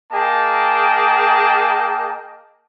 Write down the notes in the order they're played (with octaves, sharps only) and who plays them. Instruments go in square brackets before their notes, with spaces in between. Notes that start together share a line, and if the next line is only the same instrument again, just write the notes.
[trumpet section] A#3 G#4 D#5 G5 A5